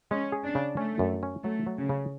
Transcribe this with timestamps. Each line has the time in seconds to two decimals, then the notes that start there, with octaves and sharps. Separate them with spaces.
0.10 G#3 C#4
0.32 G#4
0.44 D4
0.55 C#3
0.77 A3 C#4
0.99 F#2
1.23 C#4
1.44 F#3 A3
1.66 F#3
1.78 C#3
1.89 C#3